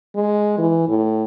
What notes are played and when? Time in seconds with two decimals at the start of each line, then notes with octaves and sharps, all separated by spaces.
0.15 G#3
0.58 E3
0.88 A2